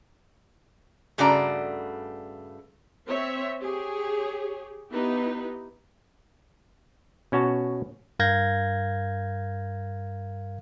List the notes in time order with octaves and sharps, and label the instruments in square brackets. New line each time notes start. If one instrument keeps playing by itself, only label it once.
[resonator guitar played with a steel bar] G2 C#3 A3 F#4 D5 A#5
[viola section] C4 C#5 E5
G4 G#4 C#5
B3 D#4 E4 G4 B4
[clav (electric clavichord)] B2 C#4 F#4 C#5 A5
[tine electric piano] G2 A#4 F5 G6 G#6 A#6